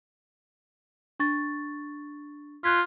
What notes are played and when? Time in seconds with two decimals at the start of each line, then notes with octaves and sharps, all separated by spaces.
1.19 D4 C#6 A6
2.64 F4 F#6 G#6 B6